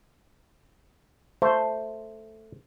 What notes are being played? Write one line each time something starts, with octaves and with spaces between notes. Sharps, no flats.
A3 C5